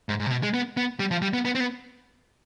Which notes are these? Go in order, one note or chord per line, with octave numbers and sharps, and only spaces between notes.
G#2
G#2
C3
B2
G#3
B3
B3
G3
F3
G3
B3
B3
C4
B3